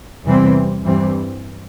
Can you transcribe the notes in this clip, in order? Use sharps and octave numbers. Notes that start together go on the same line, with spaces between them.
E2 C3 E3 G3 C4
G2 E3 G3 C4